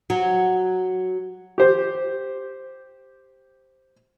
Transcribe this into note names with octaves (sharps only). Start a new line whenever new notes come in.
F#3
G4 C5